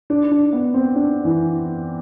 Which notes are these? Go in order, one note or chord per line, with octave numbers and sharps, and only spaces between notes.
D4
D4
B3
C4
D4
E3